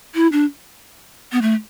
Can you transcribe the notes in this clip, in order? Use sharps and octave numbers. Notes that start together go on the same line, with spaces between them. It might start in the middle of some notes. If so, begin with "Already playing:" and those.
E4
D4
B3
A3